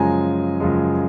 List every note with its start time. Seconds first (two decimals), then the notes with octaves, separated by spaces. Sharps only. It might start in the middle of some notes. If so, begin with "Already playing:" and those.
Already playing: F#2 C#3 F3 G#3 G#5 A#5
0.60 F#2 C#3 F3 G#3